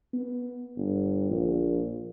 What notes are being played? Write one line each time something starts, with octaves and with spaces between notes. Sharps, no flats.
B3
G1
A#1